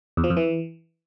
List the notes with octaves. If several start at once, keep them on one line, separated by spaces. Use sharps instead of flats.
E2
F3
F2
E3